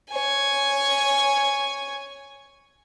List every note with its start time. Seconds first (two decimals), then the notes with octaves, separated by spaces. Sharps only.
0.10 C#5 G#5